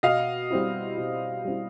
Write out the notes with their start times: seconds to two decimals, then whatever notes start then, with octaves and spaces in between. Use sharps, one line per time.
0.03 B2 D#5 F5
0.51 G3 C4 E4
0.98 B2
1.45 G3 C4 E4